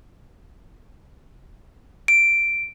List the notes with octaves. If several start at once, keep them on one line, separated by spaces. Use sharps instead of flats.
D7